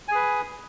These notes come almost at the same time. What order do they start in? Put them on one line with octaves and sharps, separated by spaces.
G#5 G#4 B4